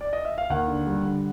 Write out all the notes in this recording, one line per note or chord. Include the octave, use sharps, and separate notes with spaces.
D5
D#5
E5
F5
D#2 F#5
D3
G3
D3